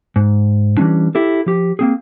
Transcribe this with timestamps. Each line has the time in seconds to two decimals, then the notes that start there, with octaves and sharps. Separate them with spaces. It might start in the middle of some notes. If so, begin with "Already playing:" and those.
0.16 G#2
0.77 E3 G3 G#3 C#4 D4
1.15 E4 G4 A4
1.46 F3 G4
1.79 A#3 C4 G#4